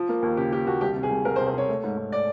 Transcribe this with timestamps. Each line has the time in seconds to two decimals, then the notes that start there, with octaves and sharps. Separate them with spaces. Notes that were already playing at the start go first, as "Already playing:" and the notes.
Already playing: F3
0.09 A#3
0.22 D#2
0.37 C#3 G4
0.52 A#3 G4
0.66 D#2 F#4
0.81 C2 G4
0.96 C3
1.03 G#4
1.10 C2
1.25 C2 A#4
1.36 C5
1.40 C3
1.47 C5
1.54 C3 C#5
1.68 A3
1.84 G#2
1.97 G#2
2.12 D5